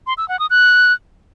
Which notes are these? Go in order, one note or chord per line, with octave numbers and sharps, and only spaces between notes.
C6
E6
F#5
D#6
F#6